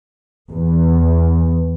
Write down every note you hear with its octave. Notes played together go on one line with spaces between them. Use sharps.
E2